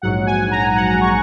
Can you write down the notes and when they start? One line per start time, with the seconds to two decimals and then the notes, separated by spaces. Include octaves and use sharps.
0.02 A#1 G#2 F#3 F#5
0.26 G#5
0.51 A#5
0.63 G#5
0.76 F#5
0.88 A#5
1.01 C#6